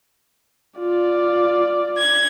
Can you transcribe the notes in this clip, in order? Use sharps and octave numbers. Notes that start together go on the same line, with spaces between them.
F4 D5
G#6